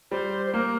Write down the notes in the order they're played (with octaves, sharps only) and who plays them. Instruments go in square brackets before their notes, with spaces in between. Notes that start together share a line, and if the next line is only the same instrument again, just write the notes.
[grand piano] G3 [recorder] C5
[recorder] C5
[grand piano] A#3 [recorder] A#4